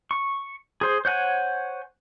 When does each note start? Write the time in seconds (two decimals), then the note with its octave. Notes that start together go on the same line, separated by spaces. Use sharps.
0.11 C#6
0.81 G#4 C5
1.05 C5 C#5 F#5 G#5